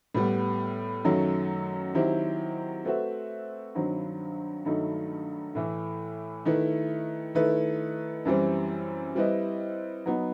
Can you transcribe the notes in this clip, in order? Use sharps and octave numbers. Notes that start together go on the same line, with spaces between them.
A2 G3 B3
F#2 D#3 F#3 A3
D#3 F#3 C4 E4 G4
A3 C4 F#4 B4 E5
G2 D#3 F#3 C4
G2 D#3 F#3 A3 D#4
A2 E3 A3
D#3 A3 E4 B4
D#3 A3 E4 B4
F#2 E3 G3 C4
G3 C4 E4 B4 D#5
F#3 B3 D#4